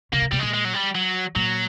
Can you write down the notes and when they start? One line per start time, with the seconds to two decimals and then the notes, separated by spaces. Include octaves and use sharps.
0.13 C#3 A#3
0.22 C3
0.31 B2 G3
0.39 A#2 G#3
0.54 G#3
0.65 F#3
0.74 G3
0.95 F#3
1.36 A#2 F#3